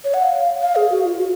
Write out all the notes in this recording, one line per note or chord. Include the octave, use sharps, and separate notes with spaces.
C#5
F#5
F5
F5
G#4
F#4
F4
F#4